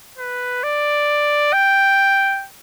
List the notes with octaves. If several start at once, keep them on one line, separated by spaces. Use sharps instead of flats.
B4
D5
G5